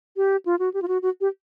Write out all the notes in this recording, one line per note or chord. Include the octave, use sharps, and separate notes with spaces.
G4
F4
F#4
G4
F4
F#4
F#4
G4